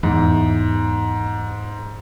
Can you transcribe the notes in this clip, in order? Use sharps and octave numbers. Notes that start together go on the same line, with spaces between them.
E2 G#2